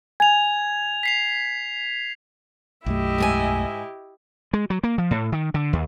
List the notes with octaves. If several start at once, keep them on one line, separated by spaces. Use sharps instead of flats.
G#5 G#6 F7
B6 C7 F7
B1 F#2 A3 E4 G4 D#5 E5
G#2 G#4 G#5
G#3
F#3
A#3
F3
A2
D#3
D3
D#2